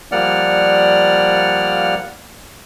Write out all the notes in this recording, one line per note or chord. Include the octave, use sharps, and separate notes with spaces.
F3 G3 A#3 D5 F#5 F6